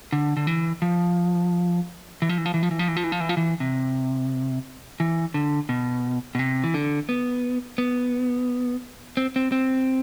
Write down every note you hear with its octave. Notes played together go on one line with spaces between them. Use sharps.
D3
D3
E3
F3
E3
F3
E3
F3
E3
F3
E3
F3
E3
F3
E3
F3
E3
F3
E3
C3
E3
D3
B2
B2
C3
E3
D3
B3
B3
C4
C4
C4